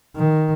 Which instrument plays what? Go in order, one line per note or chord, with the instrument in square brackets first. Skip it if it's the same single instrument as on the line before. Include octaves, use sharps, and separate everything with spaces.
[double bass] D#3